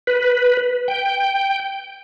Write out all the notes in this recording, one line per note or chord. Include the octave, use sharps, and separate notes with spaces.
B4
G5